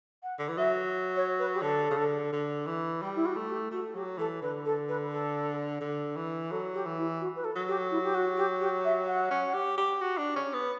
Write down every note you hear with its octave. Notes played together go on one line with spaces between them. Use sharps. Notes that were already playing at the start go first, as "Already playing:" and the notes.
F#5
D3
E3
F#3 E5
C#5
B4
G4
D3 A4
C#3
D3
D3
E3
G3 G4
E4
F#4
A3
G4
A3 F#4
F#3 G4
E3 A4
D3 B4
A4
B4
A4
D3
E3
F#3 A4
G4
E3
E4
F#4
B4
A4
F#3
G4
E4
G4
F#4
G4
G4
E5
F#5
C#4
G4
G4
F#4
D4
C#4
B3